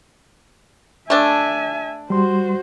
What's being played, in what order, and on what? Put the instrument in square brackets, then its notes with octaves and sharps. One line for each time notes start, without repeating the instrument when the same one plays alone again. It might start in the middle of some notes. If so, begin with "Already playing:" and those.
[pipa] A3 D4 [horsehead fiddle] E5 G#5
[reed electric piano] G3 C6 [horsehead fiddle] F#4 C5